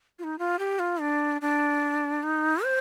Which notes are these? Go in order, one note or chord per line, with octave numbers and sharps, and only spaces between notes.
F4
D#4
F4
G4
F4
D4
D4
D#4
C5